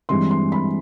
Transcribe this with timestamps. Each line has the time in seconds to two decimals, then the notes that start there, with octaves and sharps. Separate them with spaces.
0.09 G2 E3 G#3 C4 C6
0.31 C6
0.52 B5